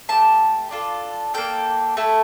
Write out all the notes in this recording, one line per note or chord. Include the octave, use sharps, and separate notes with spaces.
A3 E4 G4 A5
D4 F4 A4
A#3 D4 A4 G5
A3 E4 A4